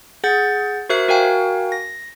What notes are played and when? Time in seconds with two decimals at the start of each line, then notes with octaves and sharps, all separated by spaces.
0.24 G#4 F#5 G6 A6
0.90 F#4 A#4 C5 E5 F#6 C7
1.08 F#4 A#4 F5 G5 G#5
1.72 A#6